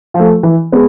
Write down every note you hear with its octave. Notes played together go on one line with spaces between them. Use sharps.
F3
A3
E3
G#3 B3